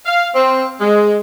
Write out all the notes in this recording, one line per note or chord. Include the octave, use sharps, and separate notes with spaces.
F5
C4
G#3